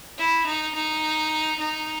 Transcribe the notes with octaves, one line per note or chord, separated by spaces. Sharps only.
E4
D#4
D#4
D#4